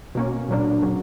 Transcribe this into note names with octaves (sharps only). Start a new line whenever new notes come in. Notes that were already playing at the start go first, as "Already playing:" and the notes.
B2 A#3 C#4
A#2 F#3 A#3 D4
C#3 F#3